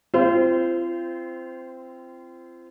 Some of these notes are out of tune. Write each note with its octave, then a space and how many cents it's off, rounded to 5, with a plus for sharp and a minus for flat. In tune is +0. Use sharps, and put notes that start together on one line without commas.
C4 +0 F4 -35 C5 -15